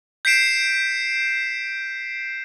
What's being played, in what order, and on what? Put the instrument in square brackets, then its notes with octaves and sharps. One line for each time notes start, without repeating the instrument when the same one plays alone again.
[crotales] G6 B6 C7 D7 E7